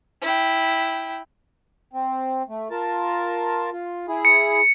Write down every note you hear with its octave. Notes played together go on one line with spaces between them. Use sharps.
E4 G5
C4
A3
F4 A#4 A5
F4
E4 G#4
C#7